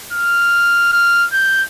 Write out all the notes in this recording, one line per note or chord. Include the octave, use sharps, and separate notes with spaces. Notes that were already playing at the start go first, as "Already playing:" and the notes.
F6
F6
G6